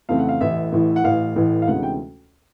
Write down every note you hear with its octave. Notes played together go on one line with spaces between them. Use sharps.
F2 C#3 E3 A3 C4 F5
F#5
F5
A1 A2 E3 E5
A1 A2 E3
F#5
A1 A2 E3 F5
A1 A2 E3
F5
D2 C3 E3 G#3 C#4 F#5
G5